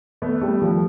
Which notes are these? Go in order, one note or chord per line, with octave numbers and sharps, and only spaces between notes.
A3 B3
G3 A3
F3 G3